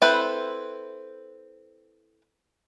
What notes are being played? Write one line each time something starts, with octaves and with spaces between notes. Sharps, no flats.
C4 E4 A4 B4 C5